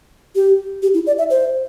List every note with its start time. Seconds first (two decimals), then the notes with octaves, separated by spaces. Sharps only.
0.36 G4
0.83 G4
0.94 E4
1.07 D5
1.18 E5
1.30 C5